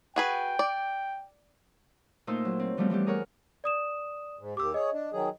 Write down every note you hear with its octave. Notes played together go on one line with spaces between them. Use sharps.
F#4 G#4 B4 G5
D5
A#2 A3 D#4 C5 C6 E6
F#3
C4
E3 F3 G3 A3 B3 C4
E3 G3 B3 G4
G#4 A#4 C#5 F#5
D5 D#6 E7
G#2
D#2 G4 D6 E6
G#4 C#5 D#5
D4
D#3 F#3 G#4